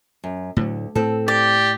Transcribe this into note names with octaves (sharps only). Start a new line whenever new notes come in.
F#2
D2 A2 D3 F#3
A2 C4 A4
G4 D5